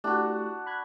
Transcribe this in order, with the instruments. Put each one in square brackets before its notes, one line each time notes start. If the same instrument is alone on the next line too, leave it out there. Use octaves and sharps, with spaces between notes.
[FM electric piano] A3 E4 G4 [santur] D4 F#4
[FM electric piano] B5 F#6 G#6